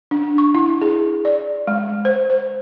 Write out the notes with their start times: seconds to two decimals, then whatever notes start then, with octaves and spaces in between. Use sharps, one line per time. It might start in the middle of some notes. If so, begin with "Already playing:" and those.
0.11 D4
0.38 C#6
0.55 E4
0.82 G#4
1.25 D5
1.67 G#3
2.05 C5
2.30 C5